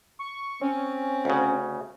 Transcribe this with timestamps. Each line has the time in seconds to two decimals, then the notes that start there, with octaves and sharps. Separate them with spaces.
0.19 C#6
0.62 C4 C#4
1.25 D2 C#3